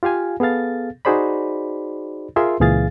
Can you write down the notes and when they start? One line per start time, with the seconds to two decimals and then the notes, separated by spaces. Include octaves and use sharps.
0.03 F4 G4 F5 G#5
0.40 B3 G#4 A4 F5 A6
1.05 D#4 F#4 G#4 C5 D5 B5
2.36 F4 G#4 A#4 E5 C6
2.60 C#2 A#2 E3 G#4 F5 A6